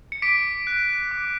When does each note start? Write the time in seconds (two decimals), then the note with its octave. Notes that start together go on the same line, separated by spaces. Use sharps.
0.12 C#7
0.22 D6 B6 D7
0.67 F#6
1.11 D6